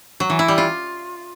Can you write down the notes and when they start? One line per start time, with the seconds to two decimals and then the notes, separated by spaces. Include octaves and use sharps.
0.20 F#3
0.30 E3
0.39 E4
0.48 G3
0.58 F4